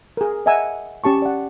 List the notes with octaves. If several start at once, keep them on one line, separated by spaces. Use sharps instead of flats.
G#4 A#4
D#5 E5 F#5 G#5 A#5 E6
C#4 G4 A5 C#6
D5 F#5